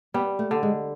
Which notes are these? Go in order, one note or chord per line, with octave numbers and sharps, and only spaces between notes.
G3 B3
A3
D3
G#3